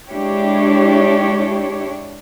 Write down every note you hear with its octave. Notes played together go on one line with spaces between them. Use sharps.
G#3 D4 E4 G4 C#5